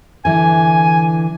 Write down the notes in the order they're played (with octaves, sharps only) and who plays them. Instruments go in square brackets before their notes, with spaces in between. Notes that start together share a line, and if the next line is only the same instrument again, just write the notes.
[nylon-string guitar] D3 E3 [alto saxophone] G#5